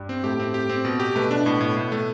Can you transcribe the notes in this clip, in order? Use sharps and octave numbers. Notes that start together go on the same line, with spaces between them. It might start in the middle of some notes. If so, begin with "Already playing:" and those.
Already playing: G2 G3
C4
A2 A3 G4
C4
G4
C4
B2
G4
B2 A3 B3
D4
A2
A2
A2
A3